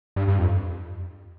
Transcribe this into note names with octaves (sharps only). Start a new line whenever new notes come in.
G2
G2
F2